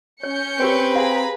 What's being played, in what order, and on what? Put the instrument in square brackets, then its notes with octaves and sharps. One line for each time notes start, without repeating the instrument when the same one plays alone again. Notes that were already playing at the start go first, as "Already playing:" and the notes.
[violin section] C#4 G6 C#7 [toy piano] C#5
[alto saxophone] C4 [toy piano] G4 A#4 C#5 [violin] B4
[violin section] G#4 A#5 B5 [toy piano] F5